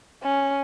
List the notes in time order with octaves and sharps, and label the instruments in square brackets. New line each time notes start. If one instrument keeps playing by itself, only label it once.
[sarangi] C#4